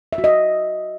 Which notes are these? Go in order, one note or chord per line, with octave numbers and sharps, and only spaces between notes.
E5
F#4
D#5